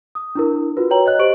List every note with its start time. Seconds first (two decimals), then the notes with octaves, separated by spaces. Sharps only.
0.15 D#6
0.35 D4 E4 A#4
0.77 F4 F#4 B4
0.90 F#4 B4 C#5 G5 A#5 F#7
1.06 C#5 D#5 F#6
1.19 G4 C5 D#5 C#6 D7 F#7